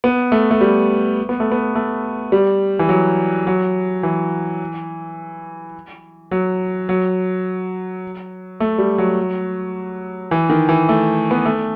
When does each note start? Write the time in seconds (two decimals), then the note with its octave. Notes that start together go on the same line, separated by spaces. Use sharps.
0.04 B3
0.32 A3
0.51 A3
0.61 G3
1.29 B3
1.40 A3
1.52 B3
1.75 A3
2.32 G3
2.79 E3
2.89 F#3
3.47 F#3
4.03 E3
6.31 F#3
6.89 F#3
8.60 A3
8.78 G3
8.98 F#3
10.31 E3
10.50 D#3
10.69 E3
10.89 A3
11.31 B3
11.46 A3